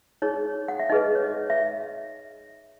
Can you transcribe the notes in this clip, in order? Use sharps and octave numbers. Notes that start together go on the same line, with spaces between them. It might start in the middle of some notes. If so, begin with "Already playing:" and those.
D#4 G#4 C#5
F#5
E5
D#4 G#4 B4 D#5
C#5
D#5
E5